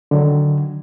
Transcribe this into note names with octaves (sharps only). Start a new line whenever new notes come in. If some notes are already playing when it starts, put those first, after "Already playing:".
D3 D#3 F#3